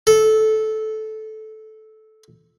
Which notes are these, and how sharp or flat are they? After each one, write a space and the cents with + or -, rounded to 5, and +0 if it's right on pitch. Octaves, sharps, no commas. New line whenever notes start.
A4 -15